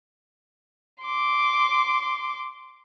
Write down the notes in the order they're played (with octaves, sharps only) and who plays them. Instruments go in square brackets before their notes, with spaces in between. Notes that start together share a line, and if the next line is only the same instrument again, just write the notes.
[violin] C6 D6